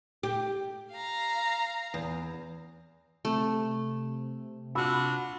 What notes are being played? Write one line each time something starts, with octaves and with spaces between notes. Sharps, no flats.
G4
F5 A#5
E2
C3 A3
D4 F4 F#4 B5 E6